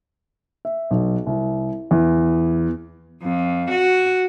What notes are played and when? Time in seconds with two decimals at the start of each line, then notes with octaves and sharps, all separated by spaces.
0.65 E5
0.91 B1
1.27 C2
1.91 E2
3.25 F2
3.70 F#4